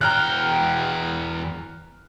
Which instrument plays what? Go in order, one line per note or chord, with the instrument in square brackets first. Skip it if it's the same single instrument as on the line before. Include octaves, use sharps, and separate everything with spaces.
[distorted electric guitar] E2 G5 [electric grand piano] A#5 F6 F#6